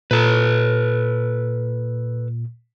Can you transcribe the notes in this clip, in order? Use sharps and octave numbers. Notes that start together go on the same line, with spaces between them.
A#2 A4 B4